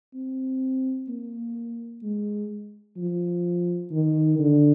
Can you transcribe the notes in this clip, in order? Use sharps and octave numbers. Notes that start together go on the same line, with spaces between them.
C4
A#3
G#3
F3
D#3
D3